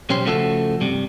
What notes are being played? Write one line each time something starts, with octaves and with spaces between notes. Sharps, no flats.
B1 C#4 G4 C5
C#3 F3 A3 F#4 G4 A4
G2 C3 G3